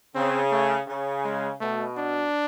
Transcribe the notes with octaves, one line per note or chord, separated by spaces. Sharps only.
C#3 C4
A3
C#3
G#3
B2 A3
D4